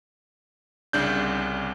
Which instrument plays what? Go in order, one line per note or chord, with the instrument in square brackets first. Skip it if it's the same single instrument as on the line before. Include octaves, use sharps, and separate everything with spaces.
[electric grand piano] C2 C#3 D4 G6